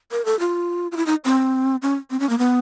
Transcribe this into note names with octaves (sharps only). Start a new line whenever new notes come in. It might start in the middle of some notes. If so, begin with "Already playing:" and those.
A#4
A4
F4
F4
E4
D#4
C4
C#4
C4
C#4
A#3
B3